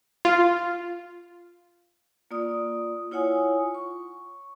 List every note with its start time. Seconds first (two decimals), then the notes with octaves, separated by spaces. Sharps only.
0.25 F4
2.31 A#3 F4 D5 D#6
3.11 E4 F4 C#5 F#5 G#5 D#6
3.75 C#6